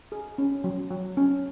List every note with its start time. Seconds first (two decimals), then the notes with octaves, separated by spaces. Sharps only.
0.12 G#4
0.38 C#4
0.64 F#3
0.91 F#3
1.17 C#4